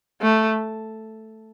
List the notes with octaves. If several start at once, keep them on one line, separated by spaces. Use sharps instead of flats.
A3